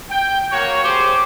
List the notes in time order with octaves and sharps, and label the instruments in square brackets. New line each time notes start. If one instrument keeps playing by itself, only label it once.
[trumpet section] G5
A#3 F#4 C#5
[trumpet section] G4 G#4 C5 [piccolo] D6